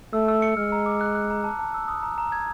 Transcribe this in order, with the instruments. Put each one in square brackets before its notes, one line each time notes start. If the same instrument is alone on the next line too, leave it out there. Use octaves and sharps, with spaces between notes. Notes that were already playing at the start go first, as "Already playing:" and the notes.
[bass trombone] A3 [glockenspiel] E6
[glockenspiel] E6
C#7
[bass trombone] G#3 [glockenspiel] F6
[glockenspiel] A#5
D6
F#6
F#6
A#5
A5
A5
E6
D#6
A#5
A#5
G#6